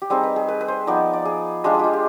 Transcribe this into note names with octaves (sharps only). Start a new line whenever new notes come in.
G4
G3 C4 D#4 G#4
B4
G#4
B4
B4
C5
F3 B3 D#4 D5
D5
G#4
G#3 D4 F4 G4
G#4
F4 G4
G4